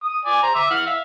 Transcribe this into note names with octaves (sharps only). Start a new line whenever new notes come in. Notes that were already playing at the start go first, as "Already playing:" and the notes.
D#6
D5 G#5
C5 A#5
E5 D6 E6
E3 F#5 F6
E5 F5